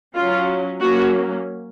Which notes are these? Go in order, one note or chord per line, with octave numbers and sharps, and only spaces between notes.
F#3 C#4 F4
F#3 A#3 C#4 F#4